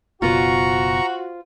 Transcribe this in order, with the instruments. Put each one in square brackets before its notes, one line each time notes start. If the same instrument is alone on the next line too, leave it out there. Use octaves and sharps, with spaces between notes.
[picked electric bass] F#1 B2 [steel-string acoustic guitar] F4 C5 [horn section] F#4 [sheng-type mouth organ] A#5 C#6